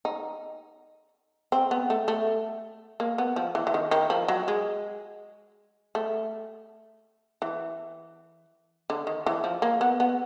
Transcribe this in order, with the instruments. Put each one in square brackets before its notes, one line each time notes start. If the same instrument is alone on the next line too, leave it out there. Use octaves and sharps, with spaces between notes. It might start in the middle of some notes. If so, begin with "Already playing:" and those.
[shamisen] D#4
C4
B3
A3
A3
A#3
B3
F3
E3
E3
D#3
D#3
F3
F#3
G#3
A3
E3
D3
D#3
E3
F3
A#3
B3
B3